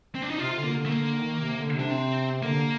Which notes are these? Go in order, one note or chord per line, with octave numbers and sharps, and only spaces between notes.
C4
D4
D#4
C3 F4
D3 F4
A#3
D3
A3
D3 A#3
D#3
C3
D3
C3
D4
C4
D3 A#3